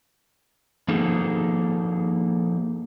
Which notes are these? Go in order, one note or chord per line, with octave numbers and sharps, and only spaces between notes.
F3 A#3 D#4 G#4 A4